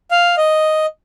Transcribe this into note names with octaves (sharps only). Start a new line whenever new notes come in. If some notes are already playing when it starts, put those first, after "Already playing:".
F5
D#5